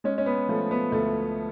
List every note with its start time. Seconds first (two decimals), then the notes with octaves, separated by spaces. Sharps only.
0.04 G#3 C#4
0.18 C#4
0.26 B3
0.49 F3 A3
0.71 B3
0.92 D2 A3